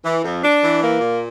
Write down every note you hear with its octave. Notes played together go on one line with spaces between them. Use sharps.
E3
F2
D4
E3
A#3
A#2